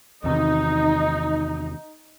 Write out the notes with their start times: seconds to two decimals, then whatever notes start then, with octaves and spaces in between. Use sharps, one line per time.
0.24 E2 C3 D#3 D#4